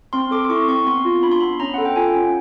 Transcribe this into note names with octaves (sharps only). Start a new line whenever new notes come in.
C4 C6
A4 D6
C6
E4 C#6
C4 C#6
B3 C6
F4
D4 B5
C6
B3 B5
C#4 A#5
A4 F#5
G5
F4 G#5
C#4